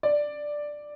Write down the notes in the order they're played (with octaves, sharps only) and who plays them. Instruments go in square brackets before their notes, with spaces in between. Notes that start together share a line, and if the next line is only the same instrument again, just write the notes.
[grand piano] D5